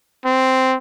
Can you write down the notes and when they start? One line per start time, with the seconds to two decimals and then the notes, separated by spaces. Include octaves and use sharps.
0.25 C4